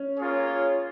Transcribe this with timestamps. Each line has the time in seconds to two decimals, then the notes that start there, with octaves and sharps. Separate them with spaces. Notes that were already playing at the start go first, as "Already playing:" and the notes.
Already playing: C#4
0.17 A#3 F4 G#4 C#5